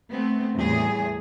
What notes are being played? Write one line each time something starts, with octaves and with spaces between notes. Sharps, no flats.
A3 B3 C4
E2 A2 G3 G#4